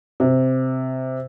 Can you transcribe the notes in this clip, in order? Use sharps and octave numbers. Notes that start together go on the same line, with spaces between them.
C3